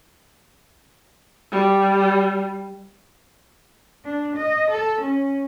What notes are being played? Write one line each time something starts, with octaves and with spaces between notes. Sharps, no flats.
G3
D4
D#5
A4
C#4